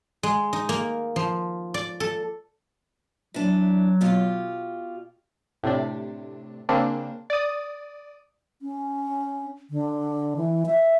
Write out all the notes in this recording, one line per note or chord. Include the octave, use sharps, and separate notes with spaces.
G#3
D#4
A#3
F3
D5
A4
E3 F#3 D4
B2 F4 G4
A2 C3 D4
C#3 A#3 C4 D4
D5 D#6
C#4
D3
E3
E5